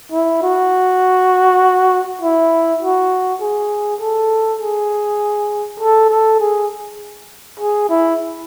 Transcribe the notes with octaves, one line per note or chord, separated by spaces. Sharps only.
E4
F#4
E4
F#4
G#4
A4
G#4
A4
A4
G#4
G#4
E4